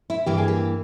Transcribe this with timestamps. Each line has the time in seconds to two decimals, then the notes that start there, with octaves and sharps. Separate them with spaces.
0.10 E4
0.26 G2 E3 A#3 G4
0.38 G#4
0.48 G4